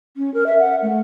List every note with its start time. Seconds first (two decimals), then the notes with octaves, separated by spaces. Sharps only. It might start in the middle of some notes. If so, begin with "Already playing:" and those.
0.17 C#4
0.34 A#4
0.46 E5
0.59 F#5
0.82 A3